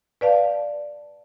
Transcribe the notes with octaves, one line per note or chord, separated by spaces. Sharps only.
B4 D5 F5 A5